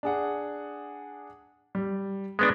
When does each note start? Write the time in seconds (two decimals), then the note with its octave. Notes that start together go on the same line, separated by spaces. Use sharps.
0.03 D4 G#4 F#5
1.75 G3
2.39 G#3 B3 D4